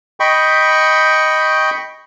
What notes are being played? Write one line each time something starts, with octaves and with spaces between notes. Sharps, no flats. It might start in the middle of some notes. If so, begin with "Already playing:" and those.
D#5 G5 B5 C#6